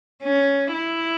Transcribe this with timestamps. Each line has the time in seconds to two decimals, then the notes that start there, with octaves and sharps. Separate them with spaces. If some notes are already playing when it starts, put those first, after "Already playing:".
0.23 C#4
0.73 E4